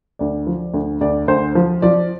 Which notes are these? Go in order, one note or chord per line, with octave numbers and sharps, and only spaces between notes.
D2 D5
F3
D2
D2 D5
D2 C5
F3
F3 D5